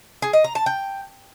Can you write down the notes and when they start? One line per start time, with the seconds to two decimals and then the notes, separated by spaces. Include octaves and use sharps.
0.22 G#4
0.33 D#5
0.44 A#5
0.55 A5
0.66 G5